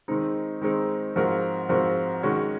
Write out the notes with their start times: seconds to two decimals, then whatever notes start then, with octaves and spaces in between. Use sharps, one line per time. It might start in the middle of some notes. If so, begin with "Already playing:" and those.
0.08 D#3 G#3 C4 D#4
0.61 D#3 G#3 C4 D#4
1.16 G#2 F3 C4 F#4 A#4
1.69 G#2 F3 C4 F#4 A#4
2.23 D#3 G#3 C#4 F#4 C#5